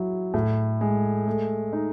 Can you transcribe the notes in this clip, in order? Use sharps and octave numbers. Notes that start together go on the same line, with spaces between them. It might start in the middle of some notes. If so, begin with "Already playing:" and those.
Already playing: F#3 E4
A2
G#3
A3
D#4